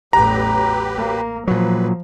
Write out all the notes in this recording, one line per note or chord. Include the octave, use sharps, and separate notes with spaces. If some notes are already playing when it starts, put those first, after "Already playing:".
A1 E2 F#3 G4 B4 A#5
A#3
A#2 F3 F#3 B4